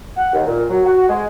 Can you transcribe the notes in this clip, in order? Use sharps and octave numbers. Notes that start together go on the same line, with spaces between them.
F#5
D#2
A#2
F#3
F#4
G#3